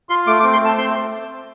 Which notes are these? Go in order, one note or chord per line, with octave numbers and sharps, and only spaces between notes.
F4 C6
A3 D6
D6
C4
C6
A3 A5
C4 C6